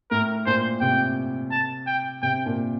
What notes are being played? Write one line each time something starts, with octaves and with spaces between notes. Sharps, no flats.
A2 A#4
A#2 C5
C3 G5
A5
G5
C3 G5
A#2